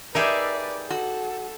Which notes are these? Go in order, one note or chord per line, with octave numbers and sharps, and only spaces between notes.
D#4 G4 G#4 A#4 B4 D5 E5
F#4 A4